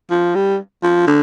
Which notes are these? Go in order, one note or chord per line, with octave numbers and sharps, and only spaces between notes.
F3
G3
F3
D3